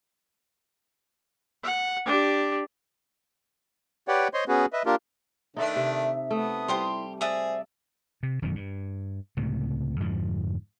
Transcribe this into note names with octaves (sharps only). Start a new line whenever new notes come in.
F#5
D4 G4
G4 B4 C#5 D5 F#5 G5
C5 C#5 D#5 C6
B3 C#4 F#4 G#4 B4
B4 D#5 E5
A#3 D4 F4 G4 A#4
D#3 A3 D4 D#4 A4 B4 E5
C3
A3 B3 D#6
G3 E4 G4 C5 C6
G#4 C5 D5 E5 D#6
C3
E1 F#2 D#3 E3
G2
C#2 A2 C3
F2 G#2 D3 F3